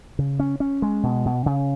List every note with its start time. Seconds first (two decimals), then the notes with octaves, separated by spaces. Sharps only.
0.19 C#3
0.39 C#4
0.60 C#4
0.82 G#3
1.03 B2
1.25 B2
1.46 C#3